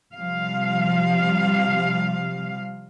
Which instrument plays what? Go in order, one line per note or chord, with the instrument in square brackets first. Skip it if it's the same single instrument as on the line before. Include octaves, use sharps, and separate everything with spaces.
[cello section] C3 F3 G3 F5